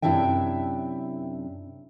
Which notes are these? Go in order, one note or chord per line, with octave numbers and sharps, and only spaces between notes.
F#2 C3 D4 E4 E5 G5